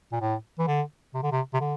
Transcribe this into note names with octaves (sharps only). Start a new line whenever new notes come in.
A#2
A2
E3
D3
C3
D3
C3
C3
D3